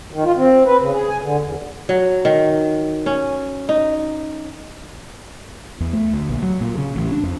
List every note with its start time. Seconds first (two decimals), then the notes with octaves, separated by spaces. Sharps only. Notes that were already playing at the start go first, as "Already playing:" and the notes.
0.12 D#3
0.24 F4
0.37 C4
0.66 B4
0.80 C#3
0.93 G#4
1.09 G#5
1.22 D3
1.41 E2
1.89 F#3
2.25 D#3
3.06 C#4
3.69 D#4
5.80 E2
5.93 A3
6.13 D2
6.29 A#1
6.42 F#3
6.61 A#2
6.77 C#3
6.96 A1
7.12 D4
7.23 F2